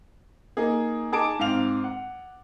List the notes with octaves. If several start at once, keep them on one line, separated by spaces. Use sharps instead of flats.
A#3 D#4 G#4
D#4 G#4 A5 D6 D7
G#2 C4 F5 F7
F#5